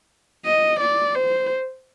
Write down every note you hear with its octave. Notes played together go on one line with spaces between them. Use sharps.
D#5
D5
C5